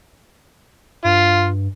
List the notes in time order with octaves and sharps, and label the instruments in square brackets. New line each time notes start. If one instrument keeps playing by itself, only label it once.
[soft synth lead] G2 [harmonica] F4